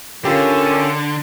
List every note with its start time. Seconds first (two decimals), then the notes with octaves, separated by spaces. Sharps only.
0.25 D3 C#4 F4 G4 A4 A#4